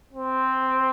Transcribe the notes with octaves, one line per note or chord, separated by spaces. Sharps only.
C4